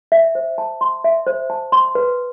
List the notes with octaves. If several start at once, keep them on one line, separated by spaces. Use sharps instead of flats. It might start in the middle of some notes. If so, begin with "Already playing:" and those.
E5
C5
A5
C6
E5
C5
A5
C6
B4